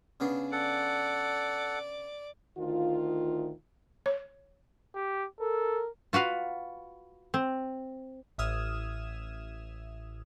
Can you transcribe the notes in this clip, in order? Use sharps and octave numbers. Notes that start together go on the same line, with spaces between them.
C#3 B3 D4
A4 D5 F#5
D2 D#3 F4
C#5
G4
A4 A#4
F4 F#4 B4 F5
C4
A1 E5 D#6 F6 G#6 E7